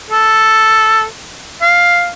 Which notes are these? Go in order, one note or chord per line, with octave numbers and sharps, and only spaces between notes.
A4
F5